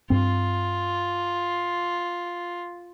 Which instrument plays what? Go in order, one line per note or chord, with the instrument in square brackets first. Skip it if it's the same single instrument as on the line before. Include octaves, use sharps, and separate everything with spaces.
[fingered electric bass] G2 C4 [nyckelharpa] F4